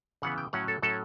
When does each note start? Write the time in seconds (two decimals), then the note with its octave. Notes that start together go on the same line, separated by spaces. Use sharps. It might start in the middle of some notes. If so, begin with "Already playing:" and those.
0.22 C#3 E3 B3 F#5
0.38 G5
0.53 A2 F#3 C#4 F#5
0.68 A4
0.82 A2 F#3 C#4 A4